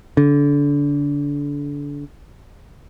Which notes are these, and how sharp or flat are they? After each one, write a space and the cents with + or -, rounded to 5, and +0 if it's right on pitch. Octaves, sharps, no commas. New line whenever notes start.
D3 -30